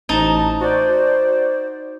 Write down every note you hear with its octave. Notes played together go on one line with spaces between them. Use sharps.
A1 D#4 A5 A#5
F#4 C5 D5